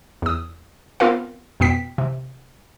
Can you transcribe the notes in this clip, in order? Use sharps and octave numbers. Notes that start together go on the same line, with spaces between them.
E2 D#6
B3 C4 F4 A#4 F5
F2 B2 B3 G5 B6
C3